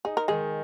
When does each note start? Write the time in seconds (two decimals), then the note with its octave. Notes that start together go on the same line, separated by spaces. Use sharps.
0.05 D#4 G#4
0.17 A#4
0.28 D#3 G#3 G#4